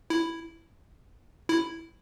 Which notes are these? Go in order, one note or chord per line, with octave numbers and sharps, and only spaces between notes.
E4
E4